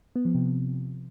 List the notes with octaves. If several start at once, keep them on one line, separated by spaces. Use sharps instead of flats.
B3
F3
C3